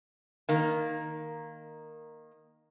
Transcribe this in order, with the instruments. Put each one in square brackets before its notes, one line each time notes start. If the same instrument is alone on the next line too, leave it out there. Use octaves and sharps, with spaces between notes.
[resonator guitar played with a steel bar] D#3 A#3